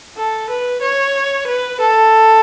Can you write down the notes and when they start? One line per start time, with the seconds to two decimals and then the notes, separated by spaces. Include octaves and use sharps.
0.18 A4
0.50 B4
0.82 C#5
1.47 B4
1.80 A4